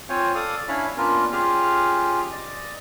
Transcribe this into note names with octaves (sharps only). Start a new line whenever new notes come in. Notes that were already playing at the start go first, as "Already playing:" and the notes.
C4 F4 C5 C#5 F5 G#5
A4 D5 F5 D#6
C#4 D4 E4 C#5 F5 B5
A#3 B3 C#4 D4 F4 A#4
C#4 F4 G4 G#4 F6
D5 D#5